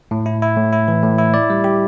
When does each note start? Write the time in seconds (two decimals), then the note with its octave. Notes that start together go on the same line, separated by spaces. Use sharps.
0.11 A2
0.26 E4
0.42 E4
0.57 A2
0.73 E4
0.88 E3
1.03 A2
1.19 E4
1.34 D5
1.50 G3
1.64 G4